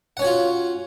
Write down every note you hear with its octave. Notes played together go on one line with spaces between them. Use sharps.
C#4 F4 F#4 C#5 F#5